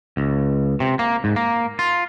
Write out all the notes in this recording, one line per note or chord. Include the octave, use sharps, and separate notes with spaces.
C#2
C3
A#3
G#2
A#3
F4